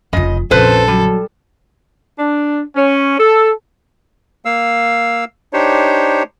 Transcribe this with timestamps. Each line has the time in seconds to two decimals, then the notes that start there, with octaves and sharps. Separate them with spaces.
0.13 F1 C#3 F4 D#5
0.51 A#1 F2 C#3 A4 B4 C5
0.88 F#3 G3
2.19 D4
2.76 C#4
3.20 A4
4.45 A#3 F5 E6
5.53 D4 D#4 G4 C5 C#5